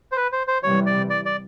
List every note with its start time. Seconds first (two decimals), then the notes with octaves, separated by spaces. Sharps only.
0.12 C5
0.17 B4
0.32 C5
0.47 C5
0.63 C3 E3 G3 C#5
0.86 D5
1.10 D5
1.26 D5